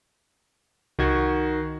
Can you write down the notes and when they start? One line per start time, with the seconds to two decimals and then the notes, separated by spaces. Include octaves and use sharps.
0.99 C2 D#3 F#4 G#6